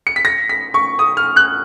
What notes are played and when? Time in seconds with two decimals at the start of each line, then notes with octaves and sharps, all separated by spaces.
0.07 C#7
0.16 B6
0.25 A#6
0.49 B6
0.74 C#6
0.99 D#6
1.17 F6
1.36 F#6